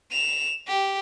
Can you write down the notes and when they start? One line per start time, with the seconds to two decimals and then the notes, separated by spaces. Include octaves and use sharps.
0.12 E7 F7
0.68 G4